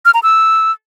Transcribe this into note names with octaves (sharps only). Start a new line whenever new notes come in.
F6
A#5
E6